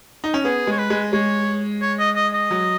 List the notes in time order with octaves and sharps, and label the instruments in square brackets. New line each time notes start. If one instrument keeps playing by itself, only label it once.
[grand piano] D#4
C#4
[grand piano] B3 [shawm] G#4
[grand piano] G#3 [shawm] C#5
[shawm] B4
[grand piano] G#3
[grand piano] G#3 [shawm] C#5
[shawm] C#5
D#5
D#5
D#5
[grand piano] F#3